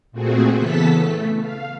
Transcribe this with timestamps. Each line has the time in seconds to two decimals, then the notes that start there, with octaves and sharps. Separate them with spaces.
0.12 A#2 A3 C4 F#4 G#4
0.57 C#3 E3 B3 A4 A5 B6
0.94 A3
1.40 F5